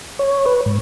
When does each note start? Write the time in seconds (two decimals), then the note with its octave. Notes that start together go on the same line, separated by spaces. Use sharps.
0.19 C#5
0.46 B4
0.66 G#2